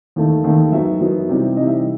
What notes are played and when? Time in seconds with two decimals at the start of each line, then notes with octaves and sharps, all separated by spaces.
0.16 D#2 D#3 A3 D#4
0.44 D#2 D#3 A3 D#4
0.72 F#2 F#3 B3 D#4 E5
1.01 F#2 F#3 B3 D#4
1.29 C3 E3 G3 D#4
1.57 C3 E3 G3 D#4 D#5
1.66 E5